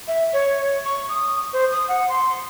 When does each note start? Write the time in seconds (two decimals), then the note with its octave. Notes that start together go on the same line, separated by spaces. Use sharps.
0.08 E5
0.33 C#5
0.85 C#6
1.09 D#6
1.53 C5
1.71 D#6
1.88 F#5
2.09 C6